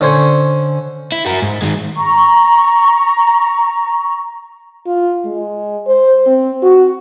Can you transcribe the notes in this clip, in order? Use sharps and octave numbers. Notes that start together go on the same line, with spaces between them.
D3 C#4 C5 G#5 C#6
E4
F#4 A#4
G#2
D#3 G#3
A#5 C#6
F4
G#3
C5
C4
F#4